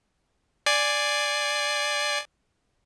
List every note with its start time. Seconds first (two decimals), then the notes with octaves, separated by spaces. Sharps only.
0.66 D5 G#5 C7